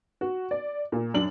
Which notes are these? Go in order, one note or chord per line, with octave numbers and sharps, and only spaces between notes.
F#4
D5
A#2
F#2 D4 F#7